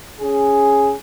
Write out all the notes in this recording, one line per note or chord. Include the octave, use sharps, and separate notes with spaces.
C#4 G#4